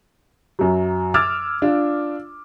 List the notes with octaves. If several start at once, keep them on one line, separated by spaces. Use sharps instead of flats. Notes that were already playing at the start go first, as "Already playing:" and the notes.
F#2 F#3
D6 E6 F6 G#6 A6
D4 F4